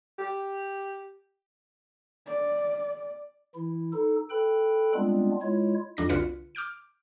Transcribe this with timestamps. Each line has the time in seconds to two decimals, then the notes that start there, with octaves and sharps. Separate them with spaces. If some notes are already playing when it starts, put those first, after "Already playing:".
0.18 G4
2.26 D5
3.54 E3 E4
3.93 D#4 A4
4.30 A4 B4 G5 B5
4.94 G3 G#3 B3 C4 D4 F4
5.41 G#3 E4 F4 C#5
5.97 F2 D4 A#6
6.09 C2 D3 F4 F#4 B4 C#7
6.55 D6 F6 G6 D7